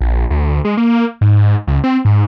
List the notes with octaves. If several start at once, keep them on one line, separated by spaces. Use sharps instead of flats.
A#1
D2
G#3
A#3
G#2
C#2
C4
G#2